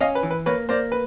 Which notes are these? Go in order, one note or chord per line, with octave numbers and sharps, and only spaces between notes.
C#4 D#5 F5
B4
E3
B4
A#3 B4 C#5
A#3 C5 D5
B4